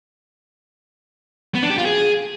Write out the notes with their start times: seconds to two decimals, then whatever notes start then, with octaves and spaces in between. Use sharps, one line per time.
1.55 B3
1.63 D4
1.70 G4
1.78 F4
1.86 G#4